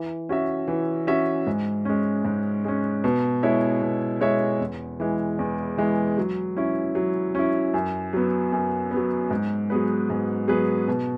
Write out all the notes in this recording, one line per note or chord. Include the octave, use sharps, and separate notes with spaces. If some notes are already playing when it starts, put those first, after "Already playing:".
Already playing: E3
C#4 F#4 E5
E3
C#4 F#4 E5
G#2
G#3 C#4
G#2
G#3 C#4
B2
G#3 E4 C#5 E5
B2
G#3 E4 C#5 E5
E2
E3 G#3
E2
E3 G#3
F#3
C#4 E4
F#3
C#4 E4
F#2
F#3 B3
F#2
B3
F#3
G#2
F#3 B3 G#4 B4
G#2
F#3 B3 G#4 B4
B2